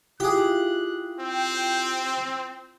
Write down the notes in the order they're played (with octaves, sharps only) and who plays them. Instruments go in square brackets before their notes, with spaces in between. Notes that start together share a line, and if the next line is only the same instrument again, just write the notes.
[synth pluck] E4 F4 [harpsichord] G4 G#4 [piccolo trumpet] F#6
[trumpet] C4 [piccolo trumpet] G5